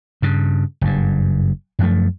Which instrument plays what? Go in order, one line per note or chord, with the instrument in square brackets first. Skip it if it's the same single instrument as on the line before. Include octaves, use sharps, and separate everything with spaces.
[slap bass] G2 C#3
F#1 G2
F#2 F3 A3